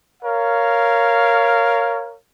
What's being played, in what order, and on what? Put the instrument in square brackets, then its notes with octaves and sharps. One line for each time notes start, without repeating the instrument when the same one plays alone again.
[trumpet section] A#4 C#5 F5